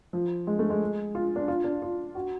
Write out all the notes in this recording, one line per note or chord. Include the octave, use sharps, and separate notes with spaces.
F3
G#3
A3
G#3
F4
D4
F4
D4
F4
F#4